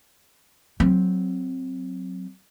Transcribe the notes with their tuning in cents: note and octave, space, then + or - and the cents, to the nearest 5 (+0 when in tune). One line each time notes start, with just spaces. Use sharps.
F#3 +0 C4 +0